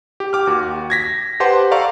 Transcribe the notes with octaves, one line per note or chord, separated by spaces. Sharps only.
G4
G5 D6 F6
D#2 F#4
G#6 A#6 B6
G4 B4 C5 F#5 A5 C6
A4 D5 F5 A#5 C#6